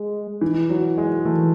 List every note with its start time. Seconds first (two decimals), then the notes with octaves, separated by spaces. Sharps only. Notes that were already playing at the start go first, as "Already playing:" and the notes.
Already playing: G#3
0.41 E3
0.70 F#3
0.98 G#3
1.25 E3 A3